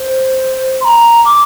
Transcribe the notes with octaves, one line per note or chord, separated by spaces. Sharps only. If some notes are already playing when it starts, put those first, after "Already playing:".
Already playing: C5
C6
A#5
D6